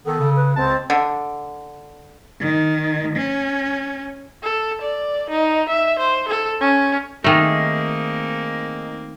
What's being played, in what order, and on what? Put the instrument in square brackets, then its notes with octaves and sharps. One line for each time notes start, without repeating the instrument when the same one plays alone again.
[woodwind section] D#3 B3 [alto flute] A4
[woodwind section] C#3
[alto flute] B4
[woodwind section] C#2 C#3 A5 [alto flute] C4
[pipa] D3
[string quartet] D#3
C#4
[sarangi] A4
D5
D#4
E5
C5
A4
C#4
[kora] D#3 A3 [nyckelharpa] A#3 C4 [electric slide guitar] D#4 G#4